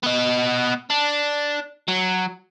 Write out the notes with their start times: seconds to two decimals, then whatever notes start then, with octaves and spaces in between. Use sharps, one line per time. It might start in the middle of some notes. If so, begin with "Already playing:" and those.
0.03 B3 D#5
0.90 D4
1.88 F#3